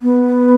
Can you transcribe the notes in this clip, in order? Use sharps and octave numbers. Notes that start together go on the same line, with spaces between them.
B3